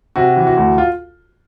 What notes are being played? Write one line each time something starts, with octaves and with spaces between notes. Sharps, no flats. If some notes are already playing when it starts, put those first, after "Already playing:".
C3 F#4
E3
F#4
D2
F4